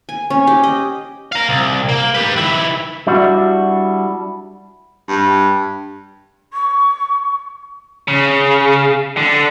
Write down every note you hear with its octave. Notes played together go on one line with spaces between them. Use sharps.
G#5
C#4
G4
D#5
F5 A#5
C2
A#3
G4 B4
D#3 E4
G3 D4 E4 F#4
G2
C#6
C#3
D3